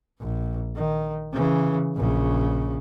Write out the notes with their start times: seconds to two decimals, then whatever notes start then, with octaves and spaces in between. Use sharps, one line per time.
0.20 A#1
0.76 D#3
1.33 C#3 E3
1.96 A#1 C#3